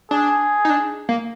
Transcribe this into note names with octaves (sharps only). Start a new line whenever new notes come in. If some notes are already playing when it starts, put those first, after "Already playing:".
D4 G#4
D#4
D4
A#3